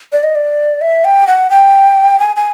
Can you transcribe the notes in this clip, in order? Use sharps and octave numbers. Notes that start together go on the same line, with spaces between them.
D5
D#5
D5
E5
G5
F#5
G5
G#5
G#5